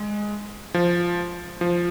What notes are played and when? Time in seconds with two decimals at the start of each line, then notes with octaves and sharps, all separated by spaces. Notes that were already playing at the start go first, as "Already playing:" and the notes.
Already playing: G#3
0.74 F3
1.61 F3